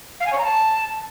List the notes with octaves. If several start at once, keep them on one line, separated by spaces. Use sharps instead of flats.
F5
G#5
C#5
A#5
A5